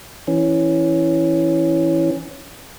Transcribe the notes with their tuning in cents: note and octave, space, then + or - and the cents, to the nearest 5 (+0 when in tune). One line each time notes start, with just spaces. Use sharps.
E3 +0 C#4 +0